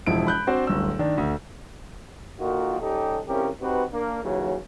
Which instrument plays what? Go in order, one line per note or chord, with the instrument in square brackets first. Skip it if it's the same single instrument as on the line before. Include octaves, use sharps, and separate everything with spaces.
[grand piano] E1 F3 E4 D7
B5 F#6 G6
C4 D4 F#4 C5 D5
D1 G1 E6
D#3 D4
D2
[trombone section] A#2 D3 D#3 F4 F#4
G3 C#4 D#4 G4 A4
C2 F2 C#3 C#4 G4 A#4
C4 D#4 F#4 G4 B4
A#3 D4
D#2 C#3 E3 F#3